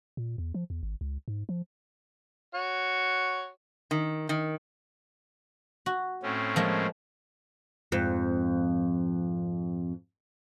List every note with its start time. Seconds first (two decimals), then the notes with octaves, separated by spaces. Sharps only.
0.17 A#2
0.38 E2
0.54 F3
0.70 E2
0.83 G#1
1.01 C#2
1.28 G#2
1.49 F3
2.55 F#4 C#5
3.91 D#3
4.29 D#3
5.86 F#4
6.23 A2 C4 C#4
6.56 F3 G#3 A#3
7.92 F2 G#2